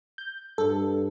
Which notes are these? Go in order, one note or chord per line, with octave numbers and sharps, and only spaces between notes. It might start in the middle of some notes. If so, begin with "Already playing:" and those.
G6
G2 A4